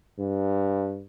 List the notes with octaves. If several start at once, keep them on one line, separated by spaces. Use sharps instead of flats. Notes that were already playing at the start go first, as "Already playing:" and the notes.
G2